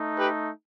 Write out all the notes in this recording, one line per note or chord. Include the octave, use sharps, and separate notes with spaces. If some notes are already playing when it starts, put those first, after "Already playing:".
Already playing: A3 D#4
G4 B4